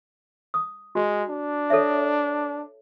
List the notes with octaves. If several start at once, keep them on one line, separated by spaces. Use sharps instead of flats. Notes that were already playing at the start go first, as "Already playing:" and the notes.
D#6
G#3 F#4
D4
A4 C#5 E5